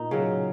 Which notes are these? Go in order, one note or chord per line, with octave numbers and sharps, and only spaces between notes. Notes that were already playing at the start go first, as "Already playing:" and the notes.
Already playing: A#2 D#4
C#3 F#3